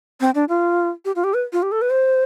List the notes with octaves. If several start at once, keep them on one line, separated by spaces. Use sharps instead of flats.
C4
D4
F4
G4
F4
G4
B4
F4
G4
A4
B4
C5